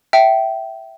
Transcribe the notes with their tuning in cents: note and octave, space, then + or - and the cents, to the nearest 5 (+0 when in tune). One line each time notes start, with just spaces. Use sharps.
E5 +0 G5 -20